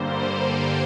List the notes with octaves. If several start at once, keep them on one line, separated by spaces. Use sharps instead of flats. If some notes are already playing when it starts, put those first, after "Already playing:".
Already playing: G2 D3 G3 A#3 C5
C5